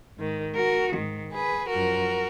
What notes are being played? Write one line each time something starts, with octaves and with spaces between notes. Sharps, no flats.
G#2 D#3
F#4 A#4
G#2 D#3
G#4 B4
F#2 F3 F#4 A#4